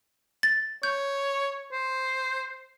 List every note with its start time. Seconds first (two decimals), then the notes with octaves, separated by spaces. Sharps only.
0.43 A6
0.83 C#5 G6
1.72 C5